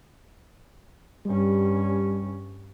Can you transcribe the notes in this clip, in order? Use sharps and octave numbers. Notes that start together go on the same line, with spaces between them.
G2 G3 C#4